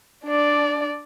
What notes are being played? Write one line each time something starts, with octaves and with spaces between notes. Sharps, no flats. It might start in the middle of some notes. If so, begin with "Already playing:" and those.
D4 D5